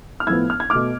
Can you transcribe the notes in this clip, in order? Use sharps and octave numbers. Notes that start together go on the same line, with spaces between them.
F6
A2 F3 B3 E6 G#6
F6
G#6
B2 A3 D6 F6